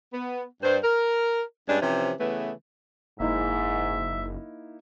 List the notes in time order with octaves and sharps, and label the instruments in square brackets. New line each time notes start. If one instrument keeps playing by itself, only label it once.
[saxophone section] B3
G2 C5
A#4
G2 G#3 C#4 D4
C3 E3 F3 C#4
C#3 E3 A3 B3
[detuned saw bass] F#1 [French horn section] G#2 [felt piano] A#3 D#4 E4 [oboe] E5